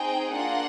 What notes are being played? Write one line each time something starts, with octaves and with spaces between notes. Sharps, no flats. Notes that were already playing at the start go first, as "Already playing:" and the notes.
Already playing: C4 D#4 G#4 G5
A#3 D4 F4 F#5